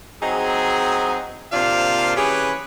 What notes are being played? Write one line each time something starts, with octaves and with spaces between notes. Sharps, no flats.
F#3 C4 D#4 G#4
C3 A#3 D4 F4 C5 F5
E3 C#4 G4 G#4 B4 C#5